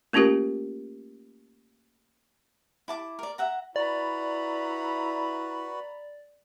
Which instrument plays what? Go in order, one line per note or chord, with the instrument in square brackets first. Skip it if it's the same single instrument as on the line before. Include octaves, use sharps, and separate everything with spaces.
[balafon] A3 A#3 C#4 F4 G4 A#4
[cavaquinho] E4 A5 D6
A#4 D5
E5 F#5 A#5
[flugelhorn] E4 [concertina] F#4 B4 [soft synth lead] D5 [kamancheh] A#5 B5